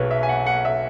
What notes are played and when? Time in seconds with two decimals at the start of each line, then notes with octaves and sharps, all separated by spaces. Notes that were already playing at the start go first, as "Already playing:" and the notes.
Already playing: B1 B2 F#3 G#4 B4 C#5
0.11 E5
0.23 G#5
0.29 F#5
0.46 F#5
0.65 E5